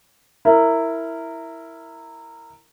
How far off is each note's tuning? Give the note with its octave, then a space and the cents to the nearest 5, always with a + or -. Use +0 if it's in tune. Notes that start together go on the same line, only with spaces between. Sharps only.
E4 +0 A#4 -20